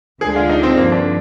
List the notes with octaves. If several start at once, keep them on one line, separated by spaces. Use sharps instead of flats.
D2 D3 G#3 D4 G#4
F4
D#4
C4
G2 D3 F3 A#3
D4